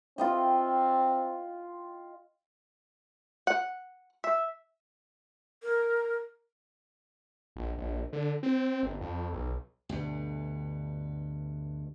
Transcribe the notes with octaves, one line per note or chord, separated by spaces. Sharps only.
C4 F4 D#5 G5
F#5
E5
A#4
A#1
A#1
D3
C4
G1
F2
B1
D2 G2 B2